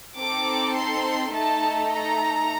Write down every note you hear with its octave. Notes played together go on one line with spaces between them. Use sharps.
C4 D#4 A4 D6
C6
A3 D#4 A4 A5
A#5